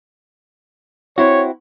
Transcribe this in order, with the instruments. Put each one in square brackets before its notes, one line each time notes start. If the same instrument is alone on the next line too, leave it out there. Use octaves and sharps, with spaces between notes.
[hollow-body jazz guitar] C4 E4 F#4 [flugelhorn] C#5